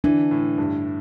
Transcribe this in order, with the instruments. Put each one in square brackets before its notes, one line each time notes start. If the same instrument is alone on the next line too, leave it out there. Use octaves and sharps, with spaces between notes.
[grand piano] E3 [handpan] D4
[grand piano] A2
G2